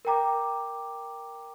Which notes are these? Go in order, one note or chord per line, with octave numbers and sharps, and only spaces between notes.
A#4 G5 A#5 D6